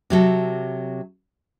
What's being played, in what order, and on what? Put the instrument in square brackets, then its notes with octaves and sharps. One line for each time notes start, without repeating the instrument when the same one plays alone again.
[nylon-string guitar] C3 F#3 A4